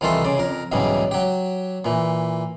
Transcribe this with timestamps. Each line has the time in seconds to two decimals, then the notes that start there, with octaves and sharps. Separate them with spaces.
0.01 C2 D#3 E3 F4 A4 C5
0.24 C#3 D5
0.38 F2 A#4
0.72 B1 E2 G#2 C#3 G3
1.11 F#3 G4
1.85 A#2 E3